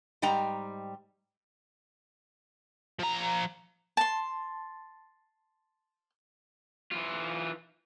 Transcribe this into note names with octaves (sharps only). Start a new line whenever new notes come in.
G#2 G3 D#5 G5 A#5
F3 A#5
A5 C6
E3 F4